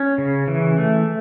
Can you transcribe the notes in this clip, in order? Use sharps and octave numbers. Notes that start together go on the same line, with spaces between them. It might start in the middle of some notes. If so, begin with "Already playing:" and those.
Already playing: C#4
C#3
E3
A3